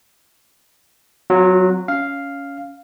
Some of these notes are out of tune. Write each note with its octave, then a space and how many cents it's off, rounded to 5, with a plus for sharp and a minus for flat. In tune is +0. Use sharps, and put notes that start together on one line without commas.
F#3 +0 C4 -35 F4 +40
C#4 +15 F5 +0